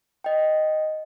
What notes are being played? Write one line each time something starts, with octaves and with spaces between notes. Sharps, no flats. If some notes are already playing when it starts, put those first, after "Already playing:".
D#5 G5